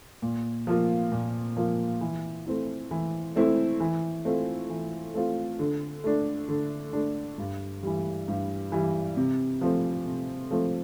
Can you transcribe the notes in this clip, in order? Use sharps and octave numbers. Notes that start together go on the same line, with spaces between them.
A#2
F3 A#3 F4
A#2
F3 A#3 F4
E3
A3 C4 E4
E3
A3 C4 E4
E3
A3 C4 F4
E3
A3 C4 F4
D3
A3 D4
D3
A3 D4
G2
E3 G3
G2
E3 G3
C3
F3 A3 C4
C3
F3 A3 C4